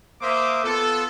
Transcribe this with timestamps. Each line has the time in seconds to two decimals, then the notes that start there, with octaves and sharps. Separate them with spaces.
0.22 A#3 C5 E5 D6 D#6
0.64 B3 F4 A4